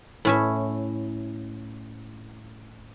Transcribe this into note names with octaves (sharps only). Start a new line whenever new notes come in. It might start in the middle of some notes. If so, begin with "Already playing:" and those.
A2 C#4 E5